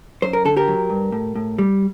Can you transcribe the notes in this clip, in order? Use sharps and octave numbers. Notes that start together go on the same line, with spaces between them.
F#2 C5
A#4
D3 A4
G4 A#4
F#3
G2
A2
A2
G3